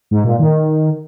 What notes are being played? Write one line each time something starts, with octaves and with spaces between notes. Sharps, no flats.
G#2
A#2
D#3